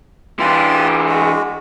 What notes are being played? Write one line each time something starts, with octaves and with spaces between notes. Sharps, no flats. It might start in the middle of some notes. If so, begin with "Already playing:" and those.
E3 D4 F4 G4 C6
G#3 F#4